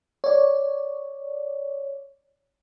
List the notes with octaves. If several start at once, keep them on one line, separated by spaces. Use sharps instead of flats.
C#5 D5